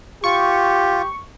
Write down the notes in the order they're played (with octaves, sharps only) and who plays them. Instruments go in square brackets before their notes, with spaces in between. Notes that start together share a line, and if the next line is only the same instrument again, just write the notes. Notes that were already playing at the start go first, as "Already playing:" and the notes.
[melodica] F4 [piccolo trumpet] G4 [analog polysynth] C#6